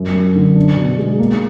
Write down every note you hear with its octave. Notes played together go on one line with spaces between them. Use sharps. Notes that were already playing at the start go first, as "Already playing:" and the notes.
Already playing: F#2
F#2
D3
D4
B2
G#3
A#3